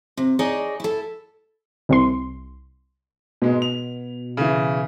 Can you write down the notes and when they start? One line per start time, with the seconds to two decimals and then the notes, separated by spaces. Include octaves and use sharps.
0.17 C3
0.39 D#4 G#4 C#5 D5
0.80 E4 A4
1.89 C2 C3 C6
3.42 G#2 B2 G#3
3.62 F7
4.37 C#3 E3